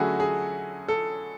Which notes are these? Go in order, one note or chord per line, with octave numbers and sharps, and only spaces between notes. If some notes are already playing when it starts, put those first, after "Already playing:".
Already playing: D3 F#3 A3 C#4 E4 F#4 G#4
G#4
A4